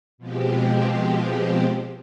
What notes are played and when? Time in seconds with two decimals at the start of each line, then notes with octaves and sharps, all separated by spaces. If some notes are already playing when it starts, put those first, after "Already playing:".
0.18 B2 F3 G#3 C4 G4